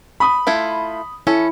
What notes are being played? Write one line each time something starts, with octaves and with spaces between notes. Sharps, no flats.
B5 D#6
A3 E4 F4
C#4 E4 A4